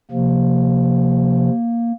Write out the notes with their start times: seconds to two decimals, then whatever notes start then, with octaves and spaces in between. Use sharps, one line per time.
0.11 C3 F3 A#3